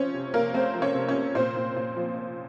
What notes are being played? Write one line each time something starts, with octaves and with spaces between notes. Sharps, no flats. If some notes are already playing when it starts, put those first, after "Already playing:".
Already playing: F3 C4 C#4 C#5
C3
C3 A#3 A#4
A3 C4 C5
F3
C#4 C#5
C3
C#4 C#5
C4
A#2 C4 C5
A#2
A#2
F3
C4